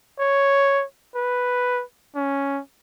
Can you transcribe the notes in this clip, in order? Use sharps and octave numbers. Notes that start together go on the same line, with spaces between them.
C#5
B4
C#4